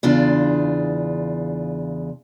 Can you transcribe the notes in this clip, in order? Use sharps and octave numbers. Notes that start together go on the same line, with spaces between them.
E2 C#3 D4 F4